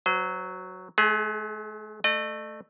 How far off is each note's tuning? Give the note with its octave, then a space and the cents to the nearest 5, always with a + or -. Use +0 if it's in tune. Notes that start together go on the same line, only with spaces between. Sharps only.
F#3 +0 C5 -30
A3 -45 G#4 +0
A3 +0 D#5 -40